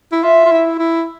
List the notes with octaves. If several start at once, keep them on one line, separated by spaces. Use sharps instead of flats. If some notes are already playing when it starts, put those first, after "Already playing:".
E4
F4 E5
F4
E4
E4